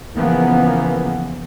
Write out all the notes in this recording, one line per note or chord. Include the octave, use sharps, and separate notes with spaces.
C#3 E3 F3 A#3 B3